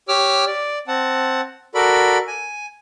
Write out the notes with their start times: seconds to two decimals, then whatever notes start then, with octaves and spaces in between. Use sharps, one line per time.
0.08 G4 C#5 D6 E6 F6
0.47 D5
0.88 C4 F#5 A5
1.75 F#4 A4 A#4 D5 B5
2.27 G#5